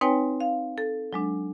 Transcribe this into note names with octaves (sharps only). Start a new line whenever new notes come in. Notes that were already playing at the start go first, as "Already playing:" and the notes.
C4 D#4 B4 C#5 G5 G#5
F5
A4
F#3 G#3 D4